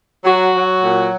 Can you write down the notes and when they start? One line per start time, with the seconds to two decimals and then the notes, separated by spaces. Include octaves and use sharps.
0.24 F#3 F#4
0.54 F#3
0.83 A#2